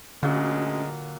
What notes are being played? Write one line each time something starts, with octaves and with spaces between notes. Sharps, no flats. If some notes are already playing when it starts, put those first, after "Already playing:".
D2 A#2 D3 F#3 G#3 C#4